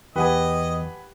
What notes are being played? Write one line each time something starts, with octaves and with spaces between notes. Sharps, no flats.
E2 G4 B4 D#5 F#5 G#5